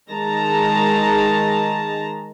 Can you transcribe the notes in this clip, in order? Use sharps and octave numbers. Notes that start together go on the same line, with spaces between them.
D#3 G#3 A5 A#5